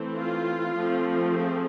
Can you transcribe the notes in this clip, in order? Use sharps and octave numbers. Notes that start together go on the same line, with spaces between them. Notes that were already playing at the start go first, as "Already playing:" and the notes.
Already playing: E3 A3 C4
F4
F3 A3 C4
G#4